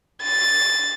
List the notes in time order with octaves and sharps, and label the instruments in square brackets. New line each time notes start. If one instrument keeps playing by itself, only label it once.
[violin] A6